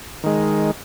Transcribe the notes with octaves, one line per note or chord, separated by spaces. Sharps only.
D#3 G#3